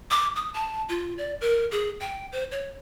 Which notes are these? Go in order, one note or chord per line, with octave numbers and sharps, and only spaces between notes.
D6
D#6
A5
F4
D5
A#4
G#4
G5
C5
C#5